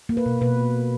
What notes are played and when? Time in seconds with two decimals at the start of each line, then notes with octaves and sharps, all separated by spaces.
0.09 A#3
0.17 B4
0.26 B2
0.41 B2 B4